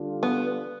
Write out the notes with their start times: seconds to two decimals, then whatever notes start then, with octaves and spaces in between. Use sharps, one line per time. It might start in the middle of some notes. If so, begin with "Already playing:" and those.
Already playing: D3 G3 D4 F4
0.23 B3